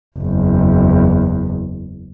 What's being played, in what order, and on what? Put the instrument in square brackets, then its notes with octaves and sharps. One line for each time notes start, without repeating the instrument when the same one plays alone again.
[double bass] F#1 E2